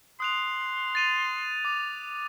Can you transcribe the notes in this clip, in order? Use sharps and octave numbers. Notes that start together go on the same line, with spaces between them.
C6 D#6 F#6 F7
A6 D#7 F7
D6